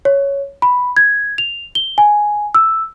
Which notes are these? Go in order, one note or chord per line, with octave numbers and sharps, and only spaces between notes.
C#5
B5
G#6
F7
G7
G#5
E6